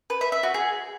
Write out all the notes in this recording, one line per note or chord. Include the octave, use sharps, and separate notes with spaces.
B4
E5
E5
F#4
G#4